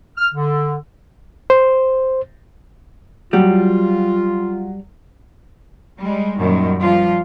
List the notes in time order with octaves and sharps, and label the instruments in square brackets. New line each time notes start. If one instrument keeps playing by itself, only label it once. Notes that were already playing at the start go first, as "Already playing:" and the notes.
[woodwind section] F6
D3
[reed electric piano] C5
[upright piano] F#3 [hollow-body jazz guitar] G3 [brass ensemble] F4
[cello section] G3 G#3
F#2 A#2 D#3 G3
F3 G3 F4